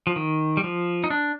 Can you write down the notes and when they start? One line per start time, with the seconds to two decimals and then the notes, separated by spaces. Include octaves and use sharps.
0.07 F3
0.16 D#3
0.57 G3
0.64 F3
1.04 D#4
1.10 D4